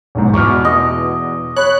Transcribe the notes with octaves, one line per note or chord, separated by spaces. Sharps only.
B1 E2 G#2
E2 B2 C#6 D6 F6
D#5
C#5 B5 F#6